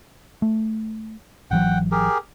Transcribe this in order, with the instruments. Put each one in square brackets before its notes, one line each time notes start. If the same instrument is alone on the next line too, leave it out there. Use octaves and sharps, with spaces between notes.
[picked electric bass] A3
[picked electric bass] G#1 E3 F#3 [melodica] F#5 G5
[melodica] G4 G#4 A#4